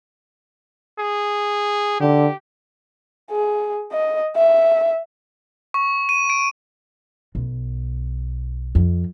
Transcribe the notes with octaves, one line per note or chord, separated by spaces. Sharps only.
G#4
D3 G4
G#4
D#5
E5
C#6
D#7
D7
B1
F2